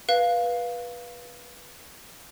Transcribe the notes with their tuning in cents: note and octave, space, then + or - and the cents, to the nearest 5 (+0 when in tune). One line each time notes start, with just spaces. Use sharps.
B4 -20 F5 +0